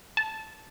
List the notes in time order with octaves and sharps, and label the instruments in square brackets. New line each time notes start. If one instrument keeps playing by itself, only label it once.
[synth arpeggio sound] A5